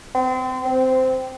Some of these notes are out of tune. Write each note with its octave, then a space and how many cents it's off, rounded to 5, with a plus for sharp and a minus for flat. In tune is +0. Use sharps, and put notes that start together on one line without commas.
C4 -30
C4 -10